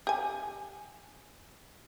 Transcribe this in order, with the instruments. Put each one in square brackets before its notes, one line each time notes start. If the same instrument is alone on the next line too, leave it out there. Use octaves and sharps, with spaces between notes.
[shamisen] G4 G#5